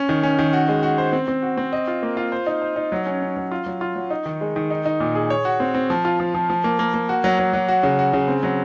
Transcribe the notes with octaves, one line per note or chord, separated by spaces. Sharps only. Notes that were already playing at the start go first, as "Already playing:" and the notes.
Already playing: C#4
D#3
C#4
D#3
F#4
G#3
F#4
C5
C4
C4
F#4
C4
D#5
F4
A#3
F4
C5
D#4
C5
D#4
F#3
C#4
C#4
F#3
F4
F#3
F4
F#3
D#4
D#3
G#3
D#3
D#4
D#4
A#2
G#4
C#5
F#4
C4
C4
F3
F4
F3
F3
F3
A#3
A#3
A#3
F#4
F#3
F#3
F#3
F#4
C#3
F#4
C#3
C4
F#3